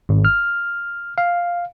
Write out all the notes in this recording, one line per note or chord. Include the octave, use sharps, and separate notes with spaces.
G#1
F6
F5